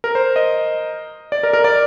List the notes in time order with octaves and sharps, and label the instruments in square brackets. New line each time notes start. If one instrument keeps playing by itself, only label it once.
[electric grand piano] A#4
C5
D#5
D5
A#4
A#4
D5